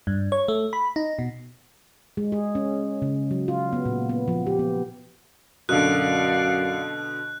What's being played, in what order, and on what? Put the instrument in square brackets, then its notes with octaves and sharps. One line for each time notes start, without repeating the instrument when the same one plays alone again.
[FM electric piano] G2
C#5
A3
B5
D#4
B2
[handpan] G#3
G#4
C#4
C#3
F#3
F4
B3
A#2
B3
F3
G4
B3
[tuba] F#2 [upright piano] B2 D3 [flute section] D5 F5 F#5 [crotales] F#6